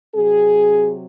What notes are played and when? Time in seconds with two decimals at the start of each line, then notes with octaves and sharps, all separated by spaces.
0.14 C3 F#3 C4 G#4